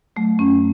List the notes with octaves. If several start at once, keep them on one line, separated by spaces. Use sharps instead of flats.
F#3 A3
F#2 C#4